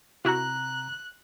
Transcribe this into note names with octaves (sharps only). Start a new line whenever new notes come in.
C3 E4 F#4 A#4 A#5 F#6